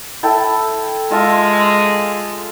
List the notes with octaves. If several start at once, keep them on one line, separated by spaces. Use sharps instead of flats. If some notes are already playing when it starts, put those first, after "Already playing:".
E4 A4 G5
G#3 F4 E5 A5